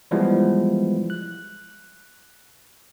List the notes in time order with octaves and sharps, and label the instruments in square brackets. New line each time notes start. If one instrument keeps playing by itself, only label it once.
[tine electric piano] E3 F3 G3 G#3 B3 E4
F#6